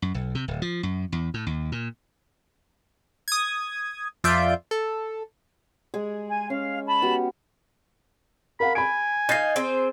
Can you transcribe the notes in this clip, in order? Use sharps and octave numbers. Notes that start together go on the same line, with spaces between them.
F#2
B1
C3
D1
F3
F#2
E2
A2
D#2
A#2
D#6 G#6
F2 F4 D5 E5 G6 D7
A4
G#3 G#4
G#5
C#4 F5
A5 B5
B3 F#4 G4
A#4 F5 F#5 B5
G#5 B5 D7
D#4 F5 G6 A6 C7
C4 G#4 C5